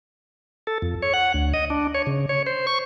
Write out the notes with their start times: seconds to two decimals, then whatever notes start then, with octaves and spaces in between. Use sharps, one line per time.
0.67 A4
0.82 F2
1.02 C#5
1.14 F#5
1.34 D2
1.54 D#5
1.70 D4
1.94 C#5
2.07 C#3
2.29 C#5
2.46 C5
2.67 C#6